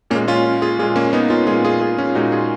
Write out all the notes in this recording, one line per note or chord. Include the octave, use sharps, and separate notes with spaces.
A#2 G#3 A#3 C#4
C#4 F4
F4 G#4
A#2 G#3 F4 G#4
A#3 C#4
B3 D#4
C#4 F4
A#2 G#3 F4 G#4
F4 G#4
F4 G#4
C#4 F4
A#2 G#3 D#4 F#4
F4 G#4